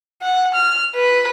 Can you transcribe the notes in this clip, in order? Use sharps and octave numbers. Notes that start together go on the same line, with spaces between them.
F#5
F6
B4